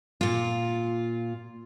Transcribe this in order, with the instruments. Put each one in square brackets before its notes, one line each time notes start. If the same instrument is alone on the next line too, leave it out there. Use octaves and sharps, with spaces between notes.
[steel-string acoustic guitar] A#2 F4